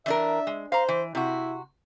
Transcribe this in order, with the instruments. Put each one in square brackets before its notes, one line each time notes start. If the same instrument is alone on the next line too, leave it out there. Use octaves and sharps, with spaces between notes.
[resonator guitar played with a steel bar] E3 D4 A#4 [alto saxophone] E5
[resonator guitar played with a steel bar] G#3
[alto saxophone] C5 [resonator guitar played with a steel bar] F5 A#5
[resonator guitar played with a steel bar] E3
[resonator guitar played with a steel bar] C3 F#4 [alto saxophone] E4